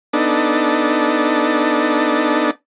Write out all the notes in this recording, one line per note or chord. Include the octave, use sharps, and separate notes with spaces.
B3 D4 D#4 A4